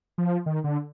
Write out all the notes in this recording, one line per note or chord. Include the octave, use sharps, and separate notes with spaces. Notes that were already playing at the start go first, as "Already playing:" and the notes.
F3
D#3
D3